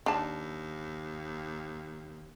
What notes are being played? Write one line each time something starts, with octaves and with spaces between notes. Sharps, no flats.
D#2 D4 A5